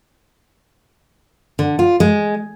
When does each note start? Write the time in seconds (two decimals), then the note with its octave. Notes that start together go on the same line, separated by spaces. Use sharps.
1.59 D3
1.79 F4
2.00 G#3